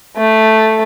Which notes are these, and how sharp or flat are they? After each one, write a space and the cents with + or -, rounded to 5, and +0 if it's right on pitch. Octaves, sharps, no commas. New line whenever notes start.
A3 +0